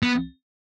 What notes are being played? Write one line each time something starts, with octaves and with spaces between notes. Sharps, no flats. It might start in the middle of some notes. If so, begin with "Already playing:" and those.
B3